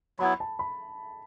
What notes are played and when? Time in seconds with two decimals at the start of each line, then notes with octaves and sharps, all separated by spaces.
0.19 F#3 B3 E4 B5
0.40 A5
0.59 B5